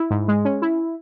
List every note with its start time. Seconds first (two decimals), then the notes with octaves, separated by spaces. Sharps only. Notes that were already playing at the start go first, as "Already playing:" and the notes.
Already playing: E4
0.11 G#2
0.28 G#3
0.45 C#4
0.62 E4